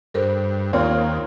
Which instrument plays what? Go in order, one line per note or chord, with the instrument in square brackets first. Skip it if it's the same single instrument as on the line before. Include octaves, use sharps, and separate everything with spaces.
[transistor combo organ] G2 [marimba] A4 A#4 C5
[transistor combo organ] D#2 [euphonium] A#3 [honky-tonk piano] C4 F4 C#5